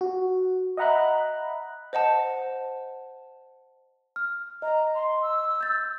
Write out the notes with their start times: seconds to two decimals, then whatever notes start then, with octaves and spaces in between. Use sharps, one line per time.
0.01 F#4
0.77 D#5 E5 F#5 A#5 B5 F#6
1.93 C5 D#5 F#5 A5
4.16 F6
4.62 D#5 A#5
4.94 C6
5.22 E6
5.61 G6 A6